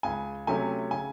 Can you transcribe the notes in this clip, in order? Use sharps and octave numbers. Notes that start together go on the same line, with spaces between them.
C#2 G#5
C3 F#3 A3 C#4 G#5
C#3 G#5